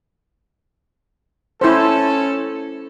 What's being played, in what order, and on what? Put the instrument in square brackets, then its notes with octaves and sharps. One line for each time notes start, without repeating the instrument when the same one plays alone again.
[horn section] C#4 A4 [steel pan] E4 C5